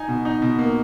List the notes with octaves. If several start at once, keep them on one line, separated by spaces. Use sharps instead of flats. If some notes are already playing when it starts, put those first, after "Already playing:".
Already playing: D#4 G#5
B2
D#4
B2
A#3